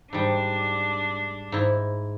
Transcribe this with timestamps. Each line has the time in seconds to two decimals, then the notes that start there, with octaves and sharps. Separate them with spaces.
0.13 G#2 G3 D4
1.52 G#2 E4